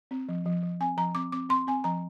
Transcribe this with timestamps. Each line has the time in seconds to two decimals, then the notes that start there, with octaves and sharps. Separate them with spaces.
0.11 C4
0.29 F3
0.46 F3
0.63 F3
0.80 C4 G#5
0.97 F3 A#5
1.15 C4 D6
1.32 C4 D6
1.49 C4 C6
1.67 C4 G#5
1.84 F3 A#5